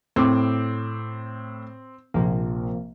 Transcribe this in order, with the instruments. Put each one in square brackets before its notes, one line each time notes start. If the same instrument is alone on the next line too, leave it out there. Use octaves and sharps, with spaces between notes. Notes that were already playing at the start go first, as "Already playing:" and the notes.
[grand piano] A2 D6 [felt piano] C4
[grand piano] A#1 [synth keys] C3 F3 A#3